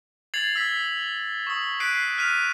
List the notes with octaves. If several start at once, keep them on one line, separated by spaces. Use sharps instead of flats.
G#6 A6 C7 F7 F#7
E6 B6
C#6 D#6
F#6 B6 C7 D7 D#7
F6 B6 D#7 F7